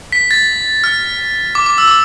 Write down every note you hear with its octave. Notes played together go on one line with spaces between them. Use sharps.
B6
A6
F6
D6
D6
E6
D6